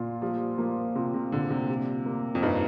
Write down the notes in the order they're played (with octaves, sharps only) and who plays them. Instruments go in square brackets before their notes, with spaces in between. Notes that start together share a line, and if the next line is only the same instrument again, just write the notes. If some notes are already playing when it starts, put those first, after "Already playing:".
Already playing: [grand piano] A#2 F4
[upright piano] F3 [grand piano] G3
[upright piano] F3 [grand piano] A#3
[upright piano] C3 [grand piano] F4
[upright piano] C3
[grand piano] A#2 [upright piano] D3
[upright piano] C3
[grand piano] G3
A#3
[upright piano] F2
[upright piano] G2 [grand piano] D#4